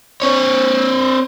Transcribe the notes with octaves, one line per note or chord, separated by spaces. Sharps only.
C4 C#5